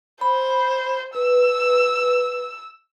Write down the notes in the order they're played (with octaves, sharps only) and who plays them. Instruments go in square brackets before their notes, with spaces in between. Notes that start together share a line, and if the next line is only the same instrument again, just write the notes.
[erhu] C5 [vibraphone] B5
[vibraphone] B4 [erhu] E6